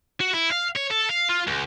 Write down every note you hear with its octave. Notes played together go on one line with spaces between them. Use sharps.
F#4
E4
F5
C#5
A4
F5
F4
C#2